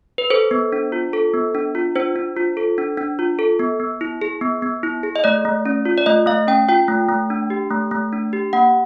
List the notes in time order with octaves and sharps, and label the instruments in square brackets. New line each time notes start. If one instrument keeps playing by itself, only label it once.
[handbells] B4
A4 C5
B3
D4
F4
A4
B3
D4
F4
D4 C5
D4
F4
A4
D4
D4
F4
A4
B3
B3
E4
G#4
B3
B3
E4
G#4
D#5
A3 D5
A3
C#4
F4
D5
A3 D#5
A3 F5
C#4 G5
F4 G5
A3
A3
D4
G4
A3
A3
D4
G4
A#3 F#5